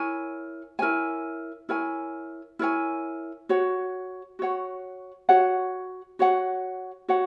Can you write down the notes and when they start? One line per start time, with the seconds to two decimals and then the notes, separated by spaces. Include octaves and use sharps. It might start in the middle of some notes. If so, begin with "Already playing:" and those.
Already playing: E4 A#4 C#5 G#5
0.79 E4 A#4 C#5 G#5
1.69 E4 A#4 C#5 G#5
2.59 E4 A#4 C#5 G#5
3.49 F#4 C#5 F#5
4.39 F#4 C#5 F#5
5.29 F#4 C#5 F#5
6.19 F#4 C#5 F#5
7.08 F#4 C#5 F#5